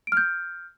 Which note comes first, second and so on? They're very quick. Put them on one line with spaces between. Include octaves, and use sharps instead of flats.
D7 F6 G6